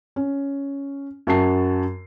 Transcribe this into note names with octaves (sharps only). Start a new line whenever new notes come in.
C#4
F#2 F#4 A5 C7